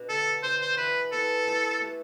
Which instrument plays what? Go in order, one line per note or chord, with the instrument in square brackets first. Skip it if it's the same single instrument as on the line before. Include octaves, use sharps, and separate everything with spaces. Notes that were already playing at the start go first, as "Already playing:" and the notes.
Already playing: [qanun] B2 D4
[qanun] D3 G3 B3 [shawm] A4
[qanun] D3 G3 B3 [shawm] C5
[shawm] C5
[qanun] E3 B3 E4 [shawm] B4
[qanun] E3 B3 E4 [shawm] A4
[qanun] A3 E4 G4 B4
A3 E4 G4 B4